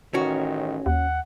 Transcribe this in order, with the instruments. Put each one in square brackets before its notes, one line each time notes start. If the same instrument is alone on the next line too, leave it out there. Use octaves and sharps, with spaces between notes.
[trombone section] A1 D#3 [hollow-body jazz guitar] C#4 F#4
[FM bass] D#2 [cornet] F#5